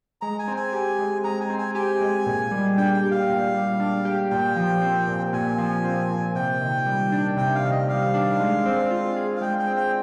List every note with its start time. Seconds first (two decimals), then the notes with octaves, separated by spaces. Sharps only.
0.21 G#3 A#5
0.39 G#5
0.48 C4
0.57 G#5
0.73 G4
0.99 G#3
1.24 G#3 A#5
1.41 G#5
1.50 C4
1.59 G#5
1.75 G4 G#5
2.01 G#3
2.26 A#2
2.51 G3
2.77 D4 G5
2.94 G5
3.03 G4
3.11 F5
3.29 A#2
3.54 G3
3.80 D4
4.05 G4
4.30 A#2 G5
4.56 F3
4.82 C4
5.07 A#2
5.33 A#2 G#5
5.58 F3
5.85 C4
6.10 A#2
6.35 C3 G5
6.61 D#3
6.87 G3
7.12 D4
7.37 C3 G5
7.55 F5
7.64 D#3
7.71 D#5
7.88 G3 F5
8.14 D4
8.40 G#3
8.66 C4
8.91 F4
9.16 G#4
9.37 F5
9.41 G#3 G5
9.59 G5
9.67 C4
9.77 G5